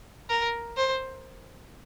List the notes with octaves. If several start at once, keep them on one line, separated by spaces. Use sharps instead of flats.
A#4
C5